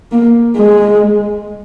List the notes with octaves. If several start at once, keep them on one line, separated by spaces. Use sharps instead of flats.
A#3
G#3